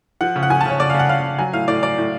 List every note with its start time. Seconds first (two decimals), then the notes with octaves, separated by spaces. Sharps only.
0.21 F3 F#5
0.36 C#3
0.43 F#5
0.50 F3 G#5
0.61 A5
0.66 C#3 C#5
0.80 C#3 D5
0.90 F5
0.94 C#3
0.99 F#5
1.09 C#3 F5
1.24 C#3
1.39 F#3 G#5
1.53 A2 F5
1.68 A2 D5
1.82 F#3 D5
1.98 A2